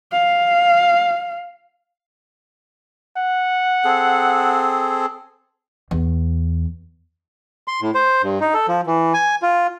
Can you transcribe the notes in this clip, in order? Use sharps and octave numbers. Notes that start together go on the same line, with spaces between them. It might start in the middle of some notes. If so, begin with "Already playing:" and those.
F5
F#5
C4 G#4 A4
E2
C6
A2
C5
G2
D#4
A4
F3
E3
G#5
F4